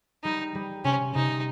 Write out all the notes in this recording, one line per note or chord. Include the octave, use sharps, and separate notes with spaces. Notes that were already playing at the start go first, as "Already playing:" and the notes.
G3 D#4
G3
C3 C#4
C3 D#4